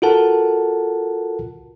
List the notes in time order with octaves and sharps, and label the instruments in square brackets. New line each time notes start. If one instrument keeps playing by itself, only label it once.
[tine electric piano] F4 F#4 A4 A#4 F#5 A5